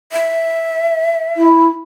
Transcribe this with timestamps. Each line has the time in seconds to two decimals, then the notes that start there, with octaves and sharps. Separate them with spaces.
0.12 E5
1.37 E4